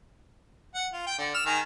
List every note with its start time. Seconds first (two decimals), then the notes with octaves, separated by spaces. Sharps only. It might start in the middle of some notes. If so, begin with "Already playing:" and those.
0.74 F#5
0.93 F4
1.06 G5
1.18 D3
1.34 E6 F6
1.46 D#3 G#4 A#5